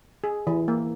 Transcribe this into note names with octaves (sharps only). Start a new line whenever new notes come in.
G#4
E3
A#3